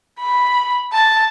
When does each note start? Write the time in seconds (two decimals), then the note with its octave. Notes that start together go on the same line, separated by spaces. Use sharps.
0.19 B5
0.93 A5